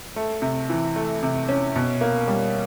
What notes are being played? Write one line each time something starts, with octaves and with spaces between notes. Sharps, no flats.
A3
C3
E3
A3
C3
C#4
B2
A#3
G3